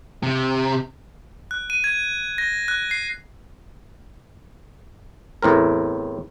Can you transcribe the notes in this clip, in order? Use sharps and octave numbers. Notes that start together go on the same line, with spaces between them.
C3
F#6
D#7
G#6
A#6
F#6
C7
E2 A2 C4 A#4